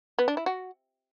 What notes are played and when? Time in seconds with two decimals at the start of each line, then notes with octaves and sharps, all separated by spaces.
0.19 B3
0.28 D4
0.37 E4
0.46 F#4